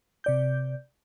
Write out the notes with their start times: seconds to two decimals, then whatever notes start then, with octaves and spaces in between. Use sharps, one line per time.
0.24 C3 D5 G6